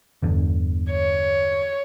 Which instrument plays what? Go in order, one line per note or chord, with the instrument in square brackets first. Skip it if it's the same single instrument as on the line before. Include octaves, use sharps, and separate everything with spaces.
[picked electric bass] G1 E2 D3
[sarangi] C#5